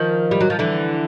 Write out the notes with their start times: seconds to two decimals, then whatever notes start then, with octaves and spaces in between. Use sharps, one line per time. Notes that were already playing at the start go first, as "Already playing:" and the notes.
Already playing: D#3 F3
0.31 G3
0.40 F#3
0.50 F3
0.59 D3 E3